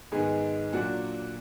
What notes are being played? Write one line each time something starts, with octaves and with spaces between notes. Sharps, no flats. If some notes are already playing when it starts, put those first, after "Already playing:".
G#2 D#3 G#3 B3 G#4
A#2 F#3 D4 F#4